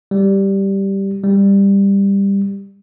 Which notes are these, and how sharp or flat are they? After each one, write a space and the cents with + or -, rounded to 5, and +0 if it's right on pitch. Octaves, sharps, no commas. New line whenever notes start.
G3 -5
G3 +15